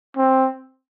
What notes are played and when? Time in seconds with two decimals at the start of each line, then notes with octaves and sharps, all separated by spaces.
0.17 C4